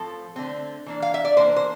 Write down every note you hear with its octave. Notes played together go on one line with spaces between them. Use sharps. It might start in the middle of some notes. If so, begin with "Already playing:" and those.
Already playing: A2 F3 C4 A4
D3 A3 C4
E3 A#3 D4
F5
E5
D5
E3 A#3 D4 C5
C5